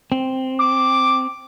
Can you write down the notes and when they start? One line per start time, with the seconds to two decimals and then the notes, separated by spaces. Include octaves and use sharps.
0.12 C4
0.60 D6